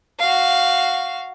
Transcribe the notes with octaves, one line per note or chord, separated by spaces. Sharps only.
F#4 F5